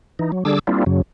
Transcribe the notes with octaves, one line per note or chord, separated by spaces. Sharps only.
E3 D#4
F#3
D3 G3 D4 G#4 D6 E6
G3 A#3 C4 D4 E4 F4
F#2 C#3 F#3